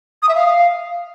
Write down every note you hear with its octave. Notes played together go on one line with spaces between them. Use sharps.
D#6
E5
F5